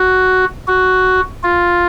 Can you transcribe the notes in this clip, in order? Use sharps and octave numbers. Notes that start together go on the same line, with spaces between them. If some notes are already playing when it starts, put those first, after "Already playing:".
Already playing: F#4
F#4
F4